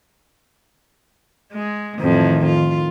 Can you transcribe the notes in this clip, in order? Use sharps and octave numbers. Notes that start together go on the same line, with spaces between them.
G#3
F2 A2 D#3 E3
F4